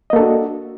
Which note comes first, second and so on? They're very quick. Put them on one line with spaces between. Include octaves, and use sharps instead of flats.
D#5 A#3 A4 D4 F#4